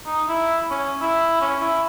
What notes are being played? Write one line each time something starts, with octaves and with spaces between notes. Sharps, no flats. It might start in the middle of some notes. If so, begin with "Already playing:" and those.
D#4
E4
C#4
E4
C#4
E4